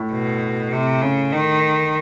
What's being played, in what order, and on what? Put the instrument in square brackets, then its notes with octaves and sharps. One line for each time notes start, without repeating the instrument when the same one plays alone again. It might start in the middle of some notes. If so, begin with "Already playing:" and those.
Already playing: [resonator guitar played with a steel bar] A2
[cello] B2
C3
C#3
D#3